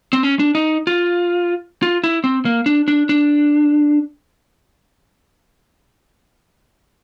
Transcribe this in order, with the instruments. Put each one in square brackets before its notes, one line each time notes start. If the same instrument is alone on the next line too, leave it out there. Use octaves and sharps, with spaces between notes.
[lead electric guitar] C4
C#4
D4
D#4
F4
F4
E4
C4
A#3
D4
D4
D4